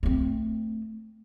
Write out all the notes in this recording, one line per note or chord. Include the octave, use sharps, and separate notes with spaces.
A3 C4